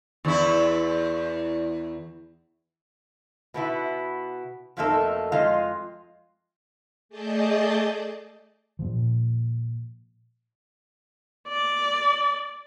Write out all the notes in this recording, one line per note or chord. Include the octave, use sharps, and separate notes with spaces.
E2 E4
B2 B3 E4
F2 B2 A3 A#3 D#4 A4
F2 G#3 F4 D#5 F5
A3 G#4 D5 D#5 A5 G6
A#2 F3
D5